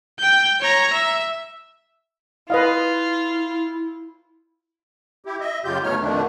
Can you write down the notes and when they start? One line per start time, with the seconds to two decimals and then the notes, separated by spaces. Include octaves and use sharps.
0.19 G5 G6
0.61 C#5 A#5
0.93 E5
2.50 E4 F4 B4 D#5 F5
5.25 E4 G4
5.40 D#5 E5
5.65 F#2 C#3 F4 G4 G6
5.83 D2 B2 A3 D#4 C#5 F6
6.01 F2 B2 D3 D#3 A3 D4